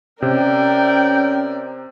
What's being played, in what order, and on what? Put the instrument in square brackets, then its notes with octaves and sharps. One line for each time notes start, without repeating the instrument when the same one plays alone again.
[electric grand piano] C3 [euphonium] C#4 [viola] A#4 D5 [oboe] G5